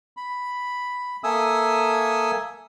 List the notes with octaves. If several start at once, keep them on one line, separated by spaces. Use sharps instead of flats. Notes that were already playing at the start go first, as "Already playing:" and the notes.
B5
A#3 A4 E5 G#5 D#6 E6